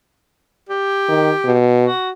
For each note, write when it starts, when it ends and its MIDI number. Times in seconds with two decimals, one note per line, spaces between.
0.69 1.57 67
1.09 1.31 51
1.45 1.87 47
1.82 2.10 66